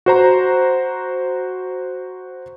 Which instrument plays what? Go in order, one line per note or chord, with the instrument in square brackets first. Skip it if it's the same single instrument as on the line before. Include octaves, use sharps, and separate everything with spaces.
[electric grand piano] F#4 C5 A#5